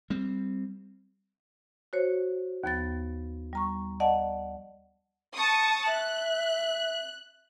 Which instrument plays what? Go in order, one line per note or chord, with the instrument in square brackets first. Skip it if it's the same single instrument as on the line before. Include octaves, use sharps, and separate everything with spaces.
[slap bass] G3 C4
[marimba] F#4 C5 C#5
D#2 F3 B3 A6
G3 A#5 C#6
D5 D#5 F#5 A5
[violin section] A5 C#6 D#6
[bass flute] E5 [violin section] F#6